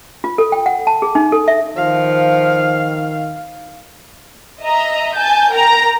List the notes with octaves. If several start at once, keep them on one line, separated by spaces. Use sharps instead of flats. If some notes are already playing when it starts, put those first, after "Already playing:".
F4
A4
G5
F#5
A5
G#4
D#4
A4
E5
D#3 F3 F5
D#5 E5 A#5
G#5 A5 G6
A#4 G5 A#5